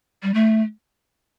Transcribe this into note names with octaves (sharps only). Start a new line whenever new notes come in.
G3
A3